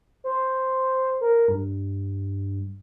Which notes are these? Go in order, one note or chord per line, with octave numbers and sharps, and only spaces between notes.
C5
A#4
G2